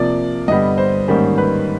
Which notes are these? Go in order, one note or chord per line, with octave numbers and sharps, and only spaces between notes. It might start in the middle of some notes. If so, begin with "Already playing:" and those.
Already playing: C3 F3 A#3 D5
G2 D3 G3 B3 D#5
C5
G#2 D#3 G3 A#3 C#4
B4